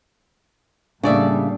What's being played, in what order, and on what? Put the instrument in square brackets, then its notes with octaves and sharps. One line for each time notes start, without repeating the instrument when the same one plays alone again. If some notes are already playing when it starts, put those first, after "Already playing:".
[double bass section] A2 G3 [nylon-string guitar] C#3 D5 E5 [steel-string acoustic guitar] A#3 D4